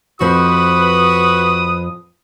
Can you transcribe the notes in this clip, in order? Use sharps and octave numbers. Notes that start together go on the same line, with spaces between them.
F2 F3 F#4 B4 C5 D#6